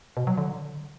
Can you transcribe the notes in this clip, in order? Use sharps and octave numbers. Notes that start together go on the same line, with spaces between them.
B2
F#3
D3